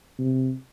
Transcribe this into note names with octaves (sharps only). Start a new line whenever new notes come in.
C3